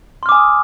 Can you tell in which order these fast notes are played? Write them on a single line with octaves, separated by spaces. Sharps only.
C6 F6 D6 G#5 D#6